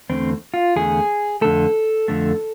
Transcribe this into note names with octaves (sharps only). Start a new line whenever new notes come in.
E2 D3 A3 C4
F4
E2 D3 A3 G#4
F2 D3 A3 A4
F2 D3 A3